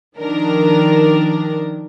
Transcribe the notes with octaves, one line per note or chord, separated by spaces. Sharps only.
D#3 F3 D4 A#4